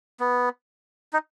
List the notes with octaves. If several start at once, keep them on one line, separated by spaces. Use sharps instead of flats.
B3
D#4